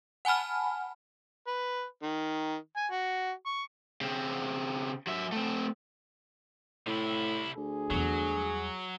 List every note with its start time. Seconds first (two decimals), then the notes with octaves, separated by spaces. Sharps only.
0.25 F#5 G#5 A5 B5 F6
1.47 B4
2.03 D#3
2.77 G#5
2.92 F#4
3.46 C#6
4.01 C#3 C4
5.07 F#3 E5
5.32 A3 C4
6.87 A2 C3 E4
7.56 D2 G#4
7.90 E2 F#3 G3